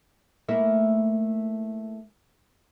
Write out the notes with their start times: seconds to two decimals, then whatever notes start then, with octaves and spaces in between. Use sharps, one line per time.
0.48 A3 A#3 E4